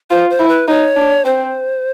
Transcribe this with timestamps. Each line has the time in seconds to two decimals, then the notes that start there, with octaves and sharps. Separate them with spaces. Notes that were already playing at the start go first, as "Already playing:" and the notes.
0.10 F4 C5
0.30 C5
0.39 E4
0.48 B4
0.68 D#4 C#5
0.96 D4
1.25 C4 C5